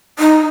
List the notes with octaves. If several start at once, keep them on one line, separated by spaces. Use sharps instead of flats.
D#4